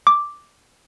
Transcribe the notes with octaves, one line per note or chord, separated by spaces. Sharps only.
D6